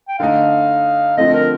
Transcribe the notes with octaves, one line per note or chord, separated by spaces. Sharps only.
G5
D3 A3 D#4 F5
D3 F3 A3 C4 D#5
A#4